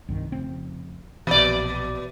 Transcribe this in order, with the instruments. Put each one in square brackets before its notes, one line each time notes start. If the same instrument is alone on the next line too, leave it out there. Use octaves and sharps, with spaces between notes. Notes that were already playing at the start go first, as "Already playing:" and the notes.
[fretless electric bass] C2 G2 D#3
F1 C#3 C4
[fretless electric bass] A#1 E3 [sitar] B2 D5